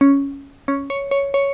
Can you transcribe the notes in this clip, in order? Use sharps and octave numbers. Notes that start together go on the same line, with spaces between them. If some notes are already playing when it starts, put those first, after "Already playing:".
C#4
C#4
C#5
C#5
C#5